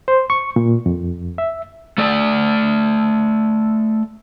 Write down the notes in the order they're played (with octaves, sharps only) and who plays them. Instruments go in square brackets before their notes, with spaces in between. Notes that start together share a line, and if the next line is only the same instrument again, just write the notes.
[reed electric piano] C5
C#6
A#2
F2
E5
[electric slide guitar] A3 A4 D5